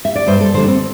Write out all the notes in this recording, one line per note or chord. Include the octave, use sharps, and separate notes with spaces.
E5
D5
G2 C5
A4
D3 G3 C5
D4
C4